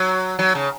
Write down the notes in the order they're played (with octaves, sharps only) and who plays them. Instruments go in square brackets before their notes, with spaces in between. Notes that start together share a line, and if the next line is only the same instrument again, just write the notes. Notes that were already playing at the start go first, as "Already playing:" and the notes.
Already playing: [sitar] F#3
F#3
C#3